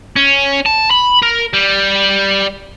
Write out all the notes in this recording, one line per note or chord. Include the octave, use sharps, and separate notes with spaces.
C#4
A5
B5
A#4
G3